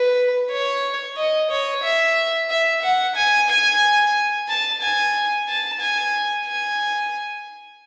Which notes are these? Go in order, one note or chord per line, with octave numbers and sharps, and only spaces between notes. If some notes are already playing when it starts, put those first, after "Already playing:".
Already playing: B4
C#5
D#5
C#5
E5
E5
F#5
G#5
G#5
A5
G#5
A5
G#5
G#5